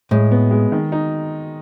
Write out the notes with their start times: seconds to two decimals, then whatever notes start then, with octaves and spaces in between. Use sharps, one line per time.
0.11 A2 G#3
0.31 B3
0.51 G#3
0.72 D#3
0.92 D#4